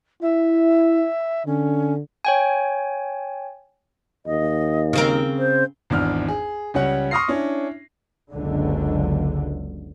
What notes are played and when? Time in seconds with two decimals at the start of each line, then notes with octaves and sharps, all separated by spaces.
0.22 E4 E5
1.47 D3 C#4
2.25 C#5 G5 G#5
4.26 D#2 D#5
4.93 C#3 C4 A#4
5.38 C5
5.90 G#1 E2 D4 F6
6.29 G#4
6.74 C#2 G3 C#4 C#5 F#5
7.11 C6 C#6 D#6 F6 A#6 C7
7.28 C#4 D4 E4
8.32 F#1 C#2 D3